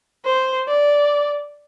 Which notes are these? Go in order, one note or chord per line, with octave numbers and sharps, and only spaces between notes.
C5
D5